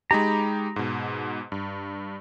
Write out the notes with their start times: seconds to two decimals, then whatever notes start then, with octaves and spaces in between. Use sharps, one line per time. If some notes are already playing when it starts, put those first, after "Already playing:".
0.11 G#3 D#4 G4 A#5 B5
0.76 G#2 B2
1.52 G2